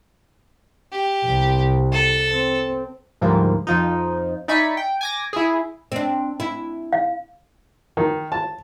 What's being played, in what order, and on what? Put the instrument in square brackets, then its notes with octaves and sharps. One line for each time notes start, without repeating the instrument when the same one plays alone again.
[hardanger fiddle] G4
[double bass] C2
[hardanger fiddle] A4
[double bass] C4
[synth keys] D2 G#2 F3 G3 A#3
F2 F3 D#4
D#4 D5 E5 G#5 B5 C#6
G5
G#5 D6 A#6
E4 G#4
[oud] C4 D4
E4
[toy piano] F5
[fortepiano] D#3
A5